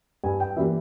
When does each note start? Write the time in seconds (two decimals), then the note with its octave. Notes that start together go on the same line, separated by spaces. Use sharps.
0.24 G2 G#5
0.40 G5
0.56 E3 G3 A#3 E5